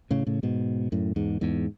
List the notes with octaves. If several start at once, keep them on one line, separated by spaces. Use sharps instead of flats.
A2 C#3
A2 C#3
G#2 B2
F#2 A2
E2 G#2
E2 G#2